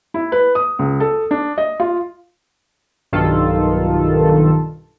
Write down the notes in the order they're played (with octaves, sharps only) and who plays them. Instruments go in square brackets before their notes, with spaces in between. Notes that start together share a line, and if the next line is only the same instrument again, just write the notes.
[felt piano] E4
B4
D#6
C#2
A4
D4
D#5
F4
[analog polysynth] B1 G2 D#3 F4 A4